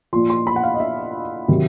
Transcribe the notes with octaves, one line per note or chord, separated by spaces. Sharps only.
A#2 F3 C6
C6
B5
F#5
F5
D#5
E5
C3 D#3 F#3